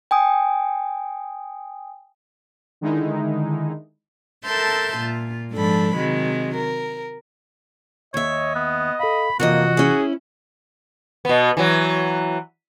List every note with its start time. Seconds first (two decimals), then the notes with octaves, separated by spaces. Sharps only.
0.11 G5 G#5 D#6
2.81 D3 D#3 G#3 D#4 E4
4.44 A4 A#4 E5 A5 C6 G6
4.96 A#2 F4
5.52 G#2 F3 D4 A4 B5
5.95 C3 D#3 F#3 G#3
6.55 A#4
8.14 D#2 C#5 D#5 E5
8.55 B3
9.00 A4 F5 B5
9.40 F2 C3 E3 A#3 F#4 A4 D#5
9.77 C#4 E4 G#4
11.25 B2 B3
11.57 E3 F#3